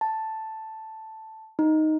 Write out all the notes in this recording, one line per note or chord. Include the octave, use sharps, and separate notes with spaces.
A5
D#4